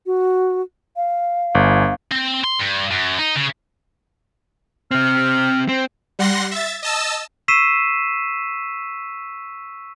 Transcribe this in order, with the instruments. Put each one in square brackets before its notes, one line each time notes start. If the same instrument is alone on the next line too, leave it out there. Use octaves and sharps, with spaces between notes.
[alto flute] F#4
F5
[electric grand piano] G1
[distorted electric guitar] C4
C6
G2
F#2
D#4
C#3
[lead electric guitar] C3 C4 [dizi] F6
[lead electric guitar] C4
[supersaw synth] G3 F#5 C6 A#6
E5 A6
D#5 A5 E6
[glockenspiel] C#6 E6 B6 C7 D#7 E7